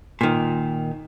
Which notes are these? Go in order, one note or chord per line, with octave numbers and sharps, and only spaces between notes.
A#2 D#3